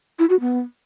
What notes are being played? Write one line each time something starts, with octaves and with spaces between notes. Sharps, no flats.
E4
F#4
B3